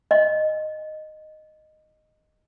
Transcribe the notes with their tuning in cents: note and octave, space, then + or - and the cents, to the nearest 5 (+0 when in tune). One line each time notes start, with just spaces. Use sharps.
D#5 -10